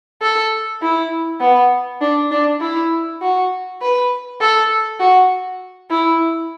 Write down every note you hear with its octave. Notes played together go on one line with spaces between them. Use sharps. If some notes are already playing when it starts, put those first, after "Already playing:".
A4
E4
B3
D4
D4
E4
F#4
B4
A4
F#4
E4